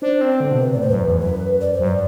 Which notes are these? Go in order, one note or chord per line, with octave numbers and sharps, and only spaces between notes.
D4 C5
C4
C5
D3
B2
C3 B4
A2 D5
C5
F#2 B4
E2
F#2 B4
D5
C5
F#2
D5